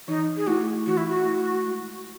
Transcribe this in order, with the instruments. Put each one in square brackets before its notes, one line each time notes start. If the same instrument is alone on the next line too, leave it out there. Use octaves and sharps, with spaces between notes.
[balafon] E3 [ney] D#4
[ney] G#4
[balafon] A3 E4 [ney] F#4
[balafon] E3 [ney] F#4
[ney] E4
F#4
[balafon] A3 E4
G#3